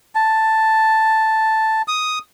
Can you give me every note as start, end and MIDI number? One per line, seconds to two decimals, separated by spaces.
0.15 1.82 81
1.88 2.19 87